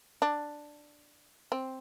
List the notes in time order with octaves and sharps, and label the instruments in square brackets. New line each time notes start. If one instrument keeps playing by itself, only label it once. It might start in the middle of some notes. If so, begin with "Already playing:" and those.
[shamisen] D4
C4